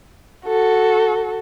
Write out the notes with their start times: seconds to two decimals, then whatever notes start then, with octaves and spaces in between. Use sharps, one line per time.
0.46 F#4 A4